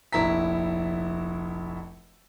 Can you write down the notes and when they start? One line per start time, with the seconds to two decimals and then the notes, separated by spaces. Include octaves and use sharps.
0.13 F1 A#1 E4 A#5 B6